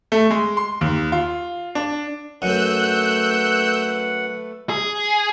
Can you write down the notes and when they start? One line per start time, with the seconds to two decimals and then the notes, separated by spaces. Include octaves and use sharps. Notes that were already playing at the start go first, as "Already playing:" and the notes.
0.12 A3
0.30 G#3
0.57 C6
0.81 D#2
1.12 F4
1.75 D4
2.42 F#2 A3 B4 F#5 E6 F#6 G6
4.70 G#4